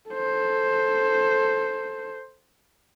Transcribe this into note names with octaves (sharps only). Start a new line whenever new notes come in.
A4 C5